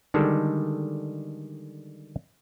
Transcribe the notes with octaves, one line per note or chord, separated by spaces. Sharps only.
D3 D#3 G3 G#3 A4